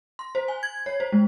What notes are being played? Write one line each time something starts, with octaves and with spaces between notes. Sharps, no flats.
C6
C5
G#5
G#6
C#5
C5
G#3